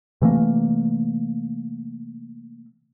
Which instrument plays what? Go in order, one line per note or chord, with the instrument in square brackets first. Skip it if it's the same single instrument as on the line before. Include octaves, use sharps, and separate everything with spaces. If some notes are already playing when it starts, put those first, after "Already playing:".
[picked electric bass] C3 E3 A3 A#3